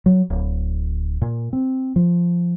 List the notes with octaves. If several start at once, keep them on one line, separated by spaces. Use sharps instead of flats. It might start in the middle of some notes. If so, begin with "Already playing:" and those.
F#3
D1
A#2
C4
F3